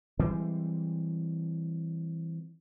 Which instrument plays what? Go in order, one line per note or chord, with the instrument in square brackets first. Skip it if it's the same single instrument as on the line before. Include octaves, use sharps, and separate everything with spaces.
[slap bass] E3 G3 G#3 C4